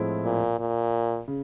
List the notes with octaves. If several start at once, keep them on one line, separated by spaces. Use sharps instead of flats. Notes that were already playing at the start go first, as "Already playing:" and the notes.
Already playing: A2 F3 G#3 C4 E4
A#2
A#2
C#3